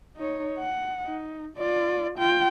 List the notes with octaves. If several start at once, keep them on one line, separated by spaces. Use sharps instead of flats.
D#4 C#5
F#5
D#4
F4 D5
F4 G5